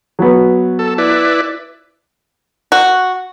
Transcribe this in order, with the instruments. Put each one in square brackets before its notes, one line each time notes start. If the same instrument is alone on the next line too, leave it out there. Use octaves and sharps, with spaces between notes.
[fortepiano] F#3 B3
[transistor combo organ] A4
E4 B4 D5
[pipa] F#4